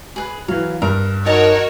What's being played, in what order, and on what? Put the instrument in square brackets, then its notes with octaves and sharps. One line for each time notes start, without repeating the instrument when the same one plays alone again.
[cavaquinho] G#4 B4
[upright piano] E3 F#3 [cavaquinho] F5
[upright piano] G2 [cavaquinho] A#4
[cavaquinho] D#4 D#5 A5 [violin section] F#4 A#4 C#5